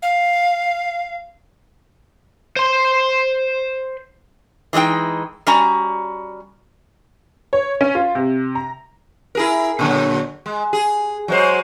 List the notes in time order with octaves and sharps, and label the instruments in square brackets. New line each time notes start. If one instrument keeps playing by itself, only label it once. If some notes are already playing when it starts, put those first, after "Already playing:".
[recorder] F5
[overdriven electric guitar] C5 C6
[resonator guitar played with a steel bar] E3 G#3 D4 D#4 G5
G3 C#4 F#4 A#5
[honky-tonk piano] C#5
C#4
F4
C3
A#5
[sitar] E4 G#4 A#4
A#2 D3 F#3
G#3
G#4
F#3 G#3 C5